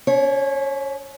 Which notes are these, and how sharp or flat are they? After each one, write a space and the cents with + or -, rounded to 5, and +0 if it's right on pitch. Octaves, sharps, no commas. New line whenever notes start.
C#4 +35 C#5 -30